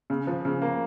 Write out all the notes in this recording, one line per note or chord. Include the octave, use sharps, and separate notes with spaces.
C#3
F3
C#3
A#3